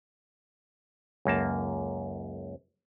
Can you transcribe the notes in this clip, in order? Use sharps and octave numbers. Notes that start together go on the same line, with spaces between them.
C#2 F#2 A#3 A5